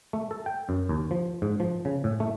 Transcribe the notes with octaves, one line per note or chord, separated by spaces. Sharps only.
A3
A4
G5
F#2
D#2
F3
G#2
F3
C#3
A2
A3